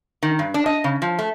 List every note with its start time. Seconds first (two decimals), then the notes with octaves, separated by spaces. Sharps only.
0.23 D#3
0.39 G2
0.54 D4
0.66 D#5
0.84 C#3
1.02 F3
1.19 A3